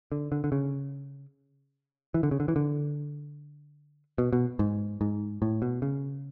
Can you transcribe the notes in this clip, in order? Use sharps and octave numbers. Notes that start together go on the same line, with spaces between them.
D3
D3
D3
C#3
E3
D3
C#3
D3
E3
D3
B2
B2
G#2
G#2
A2
B2
C#3